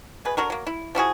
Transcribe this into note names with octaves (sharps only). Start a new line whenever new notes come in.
B2 G#4 B4
D3 F#3 F#4 A#4
F#3 A#3
E4
F3 E4 F#4 G#4